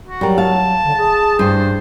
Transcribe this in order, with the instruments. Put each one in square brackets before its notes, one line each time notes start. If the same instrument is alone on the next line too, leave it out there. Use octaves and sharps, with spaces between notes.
[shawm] F#4
[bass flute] F#3 [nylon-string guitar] G3 A#4
[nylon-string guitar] F5 [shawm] A5
[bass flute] D3
G#4
[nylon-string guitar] G2 [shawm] C5